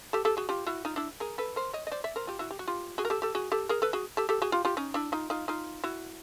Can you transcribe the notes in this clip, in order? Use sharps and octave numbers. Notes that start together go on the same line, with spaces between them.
G4 A4
G4 A4
F#4 G#4
F4 G4
E4 F#4
D#4 F4
D4 E4
G#4 A#4
A4 B4
A#4 C5
C#5 D#5
D#5
C5 D5
D5 E5
A#4 C5
F4 G4
E4 F#4
G4
F#4
F4 G4
F#4 G#4
A#4
G4 A4
G4 A4
F#4 G#4
G4 A4
G#4 A#4
A4 B4
F#4 G#4
G4 A4
G4 A4
F#4 G#4
F4 G4
F4 G4
C#4 D#4
D4 E4
D#4 F4
D#4 F4
D#4 F4
E4 F#4